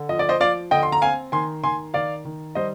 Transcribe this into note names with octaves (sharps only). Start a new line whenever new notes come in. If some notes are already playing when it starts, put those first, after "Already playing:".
Already playing: D3
F3 D#5
D5
C5 D#5
F3 D5 F5
D3 D#5 G5
C6
A#5
C4 F5 G#5
D#3 G#5 C6
D#3 G#5 C6
D#3 D5 F5
D#3
G3 C5 D#5